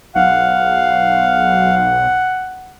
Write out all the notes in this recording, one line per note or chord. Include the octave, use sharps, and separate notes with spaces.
B1 F5 F#5